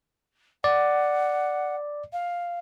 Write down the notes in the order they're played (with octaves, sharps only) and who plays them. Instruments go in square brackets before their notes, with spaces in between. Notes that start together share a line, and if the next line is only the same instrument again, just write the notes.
[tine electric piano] D5 [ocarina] F#5
[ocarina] F5